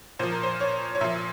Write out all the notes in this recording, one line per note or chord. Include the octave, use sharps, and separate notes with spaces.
A#2 F3 C5
A#4
C5
C#5
C#5
A#2 F3 E5